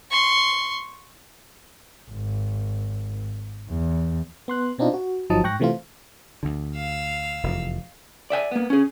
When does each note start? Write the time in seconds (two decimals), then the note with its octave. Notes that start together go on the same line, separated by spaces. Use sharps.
0.11 C6 C#6
2.11 G#1
3.69 E2
4.48 B3 C6 F#6
4.78 B2 C4 D4 D#4 F4
4.94 F#4
5.30 G1 F3 F#3 D#4 A5 D#6
5.44 G#2 G5 C#6 F#6 A#6
5.60 C3 E3 A3 C4 F4
6.43 D2 D3
6.75 F5 E6
7.43 F1 E2
8.30 D5 E5 G5 G#5
8.51 A#3 B3
8.70 C#4 G#4